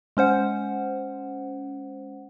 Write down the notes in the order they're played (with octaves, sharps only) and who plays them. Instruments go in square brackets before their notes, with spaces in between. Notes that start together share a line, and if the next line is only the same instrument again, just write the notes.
[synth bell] G#3 C#4 C5 F#5